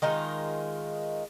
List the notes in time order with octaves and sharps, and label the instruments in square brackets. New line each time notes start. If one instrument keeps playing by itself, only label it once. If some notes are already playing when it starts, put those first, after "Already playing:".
[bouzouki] D#3 G#3 D#4 F4